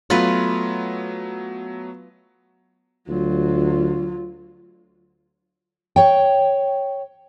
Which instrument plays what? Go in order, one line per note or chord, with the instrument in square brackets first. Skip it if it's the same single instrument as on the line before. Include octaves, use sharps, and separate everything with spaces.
[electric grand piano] F#3 A3 B3 [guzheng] F4 B4
[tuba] D2 [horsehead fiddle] F#3 F4
[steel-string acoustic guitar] C#5 G5